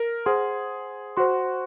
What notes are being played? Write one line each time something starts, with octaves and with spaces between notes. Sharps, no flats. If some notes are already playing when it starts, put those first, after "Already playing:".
Already playing: A#4
G#4 C5 F#5 C6
F#4 C5 F#5 C6